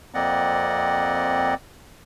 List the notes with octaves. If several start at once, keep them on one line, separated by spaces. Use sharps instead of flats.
F2 A#3 C4 D5 D#5 F#5